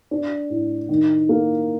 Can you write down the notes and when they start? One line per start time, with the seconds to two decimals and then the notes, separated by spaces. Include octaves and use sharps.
0.11 D4
0.50 A2
0.89 D#3
1.29 A#3